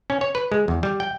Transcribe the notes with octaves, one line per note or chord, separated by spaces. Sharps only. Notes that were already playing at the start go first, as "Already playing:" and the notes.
C#4
C#5
B4
G#3
E2
G3
G5